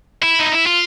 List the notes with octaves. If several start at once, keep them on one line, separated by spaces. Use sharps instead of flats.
E4
D#4
E4
F4